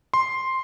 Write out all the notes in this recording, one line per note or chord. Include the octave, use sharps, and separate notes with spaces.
C6